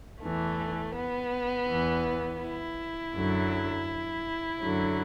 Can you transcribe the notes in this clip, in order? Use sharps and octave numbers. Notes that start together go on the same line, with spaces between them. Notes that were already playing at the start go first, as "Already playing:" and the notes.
E2 E3 A3
B3
E2 E3
E4
F#2 D3 F#3
F#2 D3 F#3